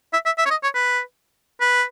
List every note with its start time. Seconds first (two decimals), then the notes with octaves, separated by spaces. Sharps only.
0.13 E5
0.26 E5
0.38 E5
0.46 C#5
0.51 D#5
0.63 C#5
0.75 B4
1.61 B4